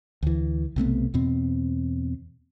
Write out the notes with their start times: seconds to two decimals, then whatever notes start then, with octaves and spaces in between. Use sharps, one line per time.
0.23 D2 E3
0.76 B1 C3 A3 B3
1.14 E2 B2 C4